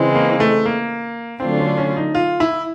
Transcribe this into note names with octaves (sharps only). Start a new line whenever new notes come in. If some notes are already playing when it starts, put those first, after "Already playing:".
Already playing: C#3 E3 G#3 C4
A#3
A3
A#3
D3 F#3 A3 C4 D4 F4
C#4
C#4
D#4
F4
E4